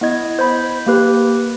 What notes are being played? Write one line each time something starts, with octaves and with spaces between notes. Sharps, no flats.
B3 E4 D#5 G#6
C5 B5
A#3 G4 B4